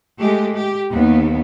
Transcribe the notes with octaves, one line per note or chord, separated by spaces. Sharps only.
G#3 A3 G4
G4
D#2 B3